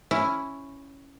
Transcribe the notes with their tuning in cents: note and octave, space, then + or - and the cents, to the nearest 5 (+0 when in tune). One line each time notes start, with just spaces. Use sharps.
C#4 +0 E4 +0